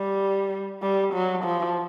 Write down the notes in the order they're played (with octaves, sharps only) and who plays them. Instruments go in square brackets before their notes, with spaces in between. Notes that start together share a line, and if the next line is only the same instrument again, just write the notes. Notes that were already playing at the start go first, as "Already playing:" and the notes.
Already playing: [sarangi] G3
G3
F#3
F3